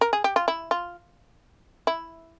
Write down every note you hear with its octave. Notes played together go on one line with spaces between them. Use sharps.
A#4
G#4
G4
F4
E4
F4
E4